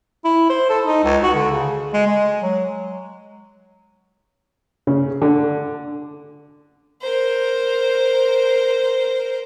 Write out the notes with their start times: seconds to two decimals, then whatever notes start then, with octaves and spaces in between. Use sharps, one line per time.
0.25 E4
0.50 C5
0.70 A4
0.86 D#4
1.04 C#2
1.23 F#4
1.35 D3
1.51 C#3
1.93 G#3
2.07 G#3
2.43 F#3
4.87 C#3
5.22 D3
7.02 A#4 C5